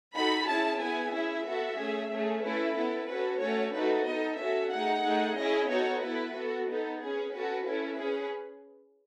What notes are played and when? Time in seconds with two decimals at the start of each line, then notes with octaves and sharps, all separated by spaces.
0.15 D#4 F#4 A4 B5
0.47 C#4 E4 G#4 A5
0.80 B3 E4 G#4 G#5
1.12 C#4 E4 G#4 E5
1.46 B3 F#4 A4
1.78 A3 C#4 G#4
2.11 A3 C#4 G#4
2.43 A3 C#4 E4 A4 B4
2.75 B3 E4 A4
3.08 C#4 F#4 A4 B4
3.41 A3 C#4 F#4 A4 C#5
3.74 A3 D#4 F#4 A4 B4
4.06 B3 D#4 A4 D#5
4.39 C#4 F#4 A4 E5
4.71 A3 D#4 G#4 F#5
5.04 A3 D#4 G#4
5.37 C#4 E4 G#4 D#5
5.69 B3 D#4 F#4 A4 C#5
6.03 B3 E4 A4 B4
6.35 B3 F#4 A4
6.67 B3 D#4 A4
6.99 C#4 G#4 B4
7.32 C#4 F#4 A4
7.65 C#4 E4 A4
7.97 C#4 G#4 B4